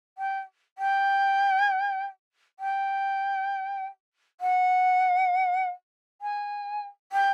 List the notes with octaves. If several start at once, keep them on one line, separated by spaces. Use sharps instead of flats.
G5
G5
G5
F#5
G#5
G5